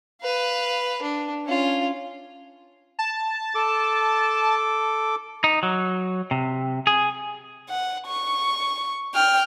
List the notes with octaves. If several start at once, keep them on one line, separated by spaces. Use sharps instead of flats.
B4 F5
D4
C#4 F4
A5
A4 D6
D#4
F#3
C3
G#4
F#5
C#6
G5 F6